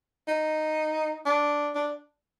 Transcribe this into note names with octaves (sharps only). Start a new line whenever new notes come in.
D#4
D4
D4